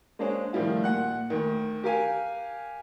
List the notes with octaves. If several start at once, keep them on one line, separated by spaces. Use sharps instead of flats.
G#3 A#3 D4 G#4 C5 C#5
A2 D#3 F3 G3 E4 F4
A#2 F#5 F#6
D2 D#3
G4 A#4 F5 G#5